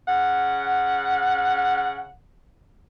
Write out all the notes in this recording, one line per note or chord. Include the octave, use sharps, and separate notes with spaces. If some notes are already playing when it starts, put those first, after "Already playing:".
C#3 F#5